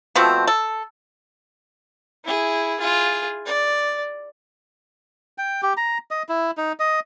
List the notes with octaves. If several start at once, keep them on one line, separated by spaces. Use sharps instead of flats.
B2 F3 A3 C4
A4
E4 G#4
F4 G#4
D5
G5
G4
A#5
D#5
E4
D#4
D#5